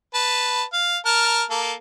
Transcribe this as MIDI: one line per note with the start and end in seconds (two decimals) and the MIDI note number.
0.14 0.64 71
0.14 0.64 81
0.73 0.97 77
1.06 1.43 70
1.06 1.43 81
1.06 1.43 89
1.50 1.73 58
1.50 1.73 69